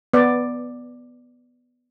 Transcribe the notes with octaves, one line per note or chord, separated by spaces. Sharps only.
B3 D5